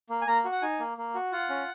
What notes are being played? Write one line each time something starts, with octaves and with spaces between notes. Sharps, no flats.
A#3
G#5
A#3 A#5
F#4
F#5
D#4 G#5
A#3
A#3
F#4
F4 F#5
C#4